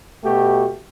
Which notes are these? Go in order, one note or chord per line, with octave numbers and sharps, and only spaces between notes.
B2 A3 F#4 G4